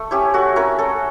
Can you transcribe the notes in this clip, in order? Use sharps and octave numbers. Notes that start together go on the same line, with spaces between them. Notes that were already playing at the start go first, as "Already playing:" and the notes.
Already playing: A3
C#4 E4 G4
A3 F#4
C#4 E4 A#4
A3 A4